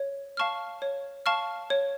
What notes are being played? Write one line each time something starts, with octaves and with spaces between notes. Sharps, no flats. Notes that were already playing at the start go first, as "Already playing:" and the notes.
Already playing: C#5
F5 A5 C#6 F6
C#5
F5 A5 C#6 F6
C#5